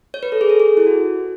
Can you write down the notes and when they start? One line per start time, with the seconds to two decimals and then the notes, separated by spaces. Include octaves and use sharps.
0.14 C#5
0.23 B4
0.32 A4
0.41 G#4
0.49 A4
0.60 G#4
0.77 E4
0.86 F#4